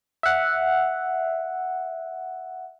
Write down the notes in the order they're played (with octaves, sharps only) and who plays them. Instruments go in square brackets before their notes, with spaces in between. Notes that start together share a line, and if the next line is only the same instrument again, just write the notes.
[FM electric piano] E5 F#5